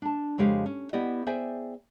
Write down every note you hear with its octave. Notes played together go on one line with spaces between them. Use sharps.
D4 A5
F2 C#3 G#3 G4 F5
C#4
B3 E4 G4 D5 D#5
G#4 C5 D5 E5 G5 G#5